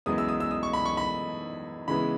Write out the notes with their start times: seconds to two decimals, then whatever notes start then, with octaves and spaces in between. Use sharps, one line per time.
0.06 F#2 E3 G#3 B3 D#6
0.18 E6
0.29 D#6
0.40 E6
0.51 D#6
0.63 C#6
0.73 B5
0.85 C#6
0.97 B5
1.88 C#3 E3 G#3 B3 B5